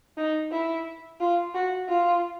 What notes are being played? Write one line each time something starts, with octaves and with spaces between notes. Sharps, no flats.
D#4
E4
F4
F#4
F4